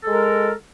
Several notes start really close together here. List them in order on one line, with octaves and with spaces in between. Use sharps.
A4 G#3 A#4